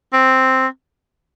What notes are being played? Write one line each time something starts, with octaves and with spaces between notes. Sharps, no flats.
C4